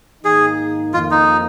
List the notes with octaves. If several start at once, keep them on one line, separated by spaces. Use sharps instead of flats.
G#2 D#3 A#3 D#4 G#4
F2 D#3 A#3 F4
D#4